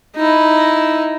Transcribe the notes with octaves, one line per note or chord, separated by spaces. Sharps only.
D#4 E4